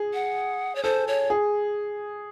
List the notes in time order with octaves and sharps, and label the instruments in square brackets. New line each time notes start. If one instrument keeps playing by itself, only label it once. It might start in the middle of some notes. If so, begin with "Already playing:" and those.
Already playing: [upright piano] G#4
[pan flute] F#5
C#5
[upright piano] A4 [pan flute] C5
[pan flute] C#5
[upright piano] G#4